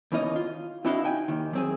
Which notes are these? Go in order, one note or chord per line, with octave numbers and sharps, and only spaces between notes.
D#2 B2 E3 C#4 D#4 D#5
F4
C4 D4 E4 F#4 D#5 F5
D#4 G5 G#5
D#2 D#3
F#2 C4 G#4